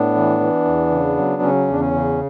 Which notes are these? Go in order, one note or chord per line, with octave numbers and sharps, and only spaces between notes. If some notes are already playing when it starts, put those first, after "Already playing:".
Already playing: A2 B3 D4
E3
E3
E2
C#3
F#3
C#3 C#4
E2 D4
C#4
C#3